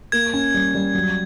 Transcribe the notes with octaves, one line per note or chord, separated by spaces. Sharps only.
A#3 G#6
C#4
G3
G3
F#3